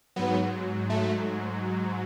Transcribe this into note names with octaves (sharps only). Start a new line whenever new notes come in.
G#2 F#3 B3
A3